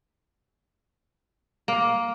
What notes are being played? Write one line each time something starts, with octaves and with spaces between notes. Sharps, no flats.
A#3